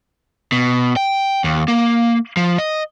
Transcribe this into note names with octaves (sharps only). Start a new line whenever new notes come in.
B2
G5
D#2
A#3
F3
D#5